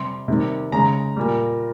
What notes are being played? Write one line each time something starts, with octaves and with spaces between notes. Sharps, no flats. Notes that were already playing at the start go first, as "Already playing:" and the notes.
Already playing: C3 G3 C6
C3 D#3 G3
C#3 G#3 A#5
A#2 G3